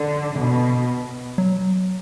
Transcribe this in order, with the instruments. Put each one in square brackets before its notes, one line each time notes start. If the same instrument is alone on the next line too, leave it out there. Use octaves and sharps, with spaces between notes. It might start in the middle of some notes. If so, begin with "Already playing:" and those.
Already playing: [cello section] D3
B2
[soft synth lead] F#3